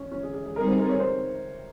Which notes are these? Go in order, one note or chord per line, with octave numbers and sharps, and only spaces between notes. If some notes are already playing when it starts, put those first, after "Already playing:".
Already playing: C#4
C#4
G#4
G#4
G#4
G3 C4 D#4 G#4 A#4
C5
A#4
C#5
C5